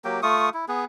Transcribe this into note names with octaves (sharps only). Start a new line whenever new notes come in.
F#3 A#3 G4 G5
A3 F4 C#6 D#6
E4
B3 G#4